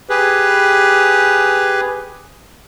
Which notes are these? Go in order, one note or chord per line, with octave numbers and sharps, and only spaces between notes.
G4 G#4 B4